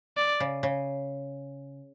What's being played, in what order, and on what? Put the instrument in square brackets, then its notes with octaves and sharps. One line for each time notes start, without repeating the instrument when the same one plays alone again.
[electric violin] D5
[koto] C#3
C#3